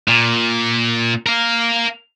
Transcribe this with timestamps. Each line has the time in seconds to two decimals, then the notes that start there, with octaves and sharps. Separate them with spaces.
0.08 A#2
1.26 A#4 F5